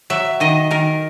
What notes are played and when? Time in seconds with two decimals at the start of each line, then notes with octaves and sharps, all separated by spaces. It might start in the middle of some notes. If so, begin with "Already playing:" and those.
0.10 F#3 E5
0.40 D#3 D#5
0.71 D#3 A#4